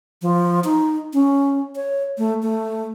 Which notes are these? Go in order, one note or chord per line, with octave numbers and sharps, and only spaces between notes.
F3
D#4
C#4
C#5
A3
A3